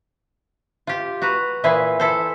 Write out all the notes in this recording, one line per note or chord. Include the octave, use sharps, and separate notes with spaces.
F4 G4
F#4 B4 A#5
A#2 E3 E4 G#4 C5
E4 A4 C5